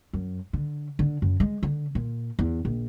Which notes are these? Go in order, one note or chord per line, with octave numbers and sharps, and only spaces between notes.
F#2
D3
D3
F#2
G#3
D3
A#2
E2
A#1